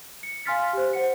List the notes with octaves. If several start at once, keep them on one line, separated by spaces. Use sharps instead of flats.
C#7
F5 G#5 C6 F6 A6 B6
G4 C5
C5 F#5 C#7